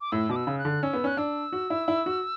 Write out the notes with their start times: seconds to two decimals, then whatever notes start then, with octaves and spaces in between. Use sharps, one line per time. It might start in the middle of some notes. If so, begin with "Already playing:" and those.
0.01 D6
0.12 A2 E6
0.29 B2 D6
0.36 E6
0.47 C#3
0.58 F#6
0.65 D3
0.83 C#4 E6
0.93 B3
1.04 C#4 F#6
1.17 D4 E6
1.52 F#4
1.70 E4
1.88 E4
2.06 F#4